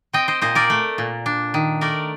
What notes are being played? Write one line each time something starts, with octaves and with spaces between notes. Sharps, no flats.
C4 D#5 G5
C5 D#5
A#2 C5 D#5
A#4 D5
A3
A#2
D4
D#3
A3 A#4 D5